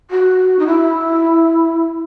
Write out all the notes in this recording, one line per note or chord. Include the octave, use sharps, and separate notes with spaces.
F#4
D#4
E4